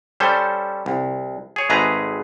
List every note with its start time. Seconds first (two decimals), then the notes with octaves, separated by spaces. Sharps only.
0.20 G3 C#4 A4 C5
0.86 C2
1.56 G#4 C#5
1.70 G#1 G#3 A3 G#4 B4 A#5